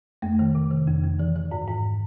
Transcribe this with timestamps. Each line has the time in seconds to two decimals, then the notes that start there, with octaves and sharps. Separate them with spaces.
0.22 F2 A3
0.39 D#3
0.55 C3
0.71 D#3
0.87 F2
1.04 F2
1.19 E3
1.36 E3
1.51 G#2
1.68 G#2